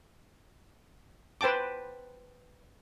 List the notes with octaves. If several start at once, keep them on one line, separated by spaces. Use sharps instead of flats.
B4 C5 G5 A5 D6